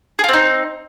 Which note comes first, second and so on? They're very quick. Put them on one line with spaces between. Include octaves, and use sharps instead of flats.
G#4 F4 C4 D#4